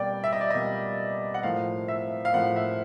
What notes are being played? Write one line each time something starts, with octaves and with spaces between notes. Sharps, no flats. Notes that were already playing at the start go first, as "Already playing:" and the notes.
Already playing: B2 G3 A#3 D5 G5
E5
D#5
D5
B2 G3 A#3 D#5
F#5
A2 F3 A#3 F5
E5
F5
A2 F3 A#3 F#5
E5